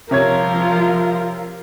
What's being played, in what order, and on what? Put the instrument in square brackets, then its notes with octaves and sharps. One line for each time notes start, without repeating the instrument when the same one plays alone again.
[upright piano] C3 C#5 G#6 [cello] F3 F4 [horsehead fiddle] A#4